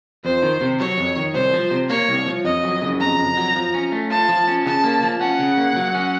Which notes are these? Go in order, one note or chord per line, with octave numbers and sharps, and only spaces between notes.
F2 C5
D#3
C3
F#3 C#5
F2
D#3
C2 C5
F3
C3
A#3 C#5
C2
F3
F2 D#5
F#3
C#3
F2 A#5
F2
F#3
F3
C#4
A3
F4 A5
F3
C#4
C#3 A5
A#3
F3
C#4 F#5
C#3
A#3
F#3
C#4